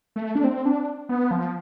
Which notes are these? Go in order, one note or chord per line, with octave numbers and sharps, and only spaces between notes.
A3
D4
C4
D4
B3
F3